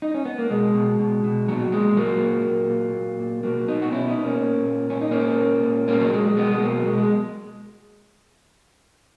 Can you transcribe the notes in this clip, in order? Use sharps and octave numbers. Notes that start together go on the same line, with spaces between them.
D#4
C#4
B3
A#3
B2 G#3
B2
B2
B2
A#2 F#3
A#2 G#3
A#2 F#3 A#3
A#2
A#2
A#2
A#2
A#2
B2 F#3 A#3
B2 B3 D#4
F#4
B2 C#4 E4
B3 D#4
B2
A#3 C#4
A#2
A#2
A#2 C#4
D#4
A#2 A#3 C#4
A#2
A#2
A#2 A#3 C#4
F#3 A#3
A#2 G#3
G#3
B2 G#3 B3
G#3
B2 F#3 A#3
B2 G#3
G#3